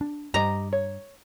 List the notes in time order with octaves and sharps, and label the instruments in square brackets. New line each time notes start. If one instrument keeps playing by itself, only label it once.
[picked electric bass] D4
[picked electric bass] G2 [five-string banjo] G4 D#5 [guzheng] A#5
[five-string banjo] C#5